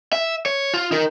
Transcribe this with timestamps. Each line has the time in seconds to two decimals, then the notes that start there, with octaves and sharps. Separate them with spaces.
0.13 E5
0.46 C#5
0.74 F4
0.92 D#4 A#4